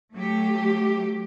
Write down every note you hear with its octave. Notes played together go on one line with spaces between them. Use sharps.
F#3 A3 G4